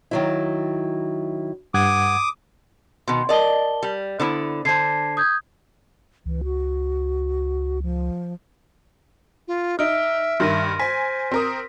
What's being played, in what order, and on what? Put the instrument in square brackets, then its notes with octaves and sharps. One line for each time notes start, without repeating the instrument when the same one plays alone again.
[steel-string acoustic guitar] D#3 F#3 E4
[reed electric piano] G2 F#5 G#6 [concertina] D6 D#6
[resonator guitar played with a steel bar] B2 D#3 [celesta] C6
[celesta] A#4 A5 G7 [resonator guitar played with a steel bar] D5 D#5
[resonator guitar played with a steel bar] G3
[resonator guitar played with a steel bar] D3 B3 E4 [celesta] C5
[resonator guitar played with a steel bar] D3 C5 [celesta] A5 G#6 C7
[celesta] D#6 G6 G#6
[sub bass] C#2 [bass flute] E3
[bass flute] F#4
F3
[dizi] F4
[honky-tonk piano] D#4 [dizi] E5 [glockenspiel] F6 D7
[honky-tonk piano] G2 D#3 [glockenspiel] C6 A#6 D#7
[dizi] C5 [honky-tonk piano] G#5 [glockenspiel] B6
[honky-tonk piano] C4 A#4 D#6